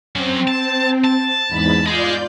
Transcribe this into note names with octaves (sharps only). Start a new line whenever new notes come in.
F#3 C4 C#4
A5
A5
E2 G#2 B5
F4 G#4 D5 D#5 G6